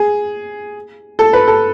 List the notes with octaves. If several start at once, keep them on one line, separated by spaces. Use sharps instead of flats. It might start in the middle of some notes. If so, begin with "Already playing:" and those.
Already playing: G#4
A4
B4
A4